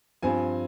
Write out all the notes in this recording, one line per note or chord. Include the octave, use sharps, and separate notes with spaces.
G2 F3 C4 G#5